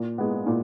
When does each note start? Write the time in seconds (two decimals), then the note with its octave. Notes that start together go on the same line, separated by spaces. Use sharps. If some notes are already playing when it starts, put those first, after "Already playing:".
Already playing: A#2
0.18 G#3 B3
0.47 A#2